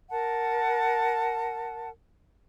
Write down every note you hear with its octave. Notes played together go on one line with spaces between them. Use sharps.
A#4 F#5 A5